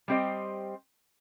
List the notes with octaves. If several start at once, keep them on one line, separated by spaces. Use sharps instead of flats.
G3 C4 G4 C5 D#5